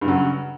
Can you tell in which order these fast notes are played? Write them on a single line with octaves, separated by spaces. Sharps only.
G2 C#3 F#3